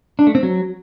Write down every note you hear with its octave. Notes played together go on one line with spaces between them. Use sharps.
D4
A3
C4
F#3